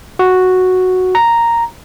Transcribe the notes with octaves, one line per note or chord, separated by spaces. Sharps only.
F#4
A#5